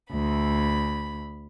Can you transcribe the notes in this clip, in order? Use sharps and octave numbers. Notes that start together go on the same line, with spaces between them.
D2 B5